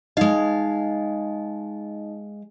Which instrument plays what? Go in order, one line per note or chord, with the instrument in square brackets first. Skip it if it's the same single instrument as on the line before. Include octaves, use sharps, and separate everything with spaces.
[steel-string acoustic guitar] G#3 F5 [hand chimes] D#4 D#5